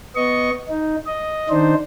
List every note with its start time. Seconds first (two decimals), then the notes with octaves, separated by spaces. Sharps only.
0.16 B3 D#5 C#6
0.69 D#4
1.07 D#5
1.49 D#3 D4 D#4 C5